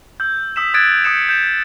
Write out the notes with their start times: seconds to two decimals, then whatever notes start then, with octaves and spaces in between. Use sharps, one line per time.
0.20 E6 G6
0.56 D#6 E6 B6 E7
0.74 D#6 F#6 G#6 A6 D7
1.05 D#6 G6 C#7 E7
1.29 G6 E7